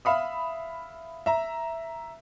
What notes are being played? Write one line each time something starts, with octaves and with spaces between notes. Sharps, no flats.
E5 F5 B5 D#6
E5 A#5